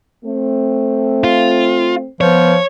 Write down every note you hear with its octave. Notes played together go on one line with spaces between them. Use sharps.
A3 C4
F4
F3 B3 C#5